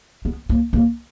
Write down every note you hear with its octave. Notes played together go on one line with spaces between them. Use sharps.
B3
A#3
A#3